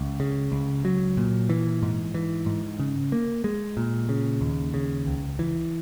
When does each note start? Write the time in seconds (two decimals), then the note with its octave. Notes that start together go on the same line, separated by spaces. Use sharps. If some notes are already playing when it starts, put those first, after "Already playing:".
Already playing: C#2
0.20 C#3
0.52 C#2
0.85 F#3
1.17 A#2
1.50 E3
1.83 G#2
2.14 E3
2.46 G#2
2.79 C#3
3.12 A#3
3.44 G#3
3.77 A#2
4.09 C#3
4.41 D#2
4.74 C#3
5.07 C#2
5.39 E3